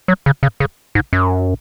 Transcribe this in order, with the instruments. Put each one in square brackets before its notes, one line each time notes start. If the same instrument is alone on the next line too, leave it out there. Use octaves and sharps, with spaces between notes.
[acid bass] F#3
C#3
C#3
C#3
G#2
F#2